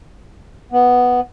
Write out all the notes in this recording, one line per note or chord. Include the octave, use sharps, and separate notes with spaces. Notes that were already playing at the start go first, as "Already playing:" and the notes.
B3